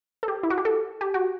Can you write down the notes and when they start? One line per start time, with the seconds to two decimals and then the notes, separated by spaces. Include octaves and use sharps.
0.23 A4
0.28 G4
0.43 E4
0.50 F#4
0.58 G4
0.65 A4
1.01 G4
1.14 F#4